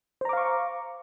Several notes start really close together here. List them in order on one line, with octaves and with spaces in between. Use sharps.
C5 A#5 D6 F5 C#6